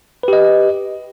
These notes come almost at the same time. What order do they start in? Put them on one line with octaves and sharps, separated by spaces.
B4 G4 D#5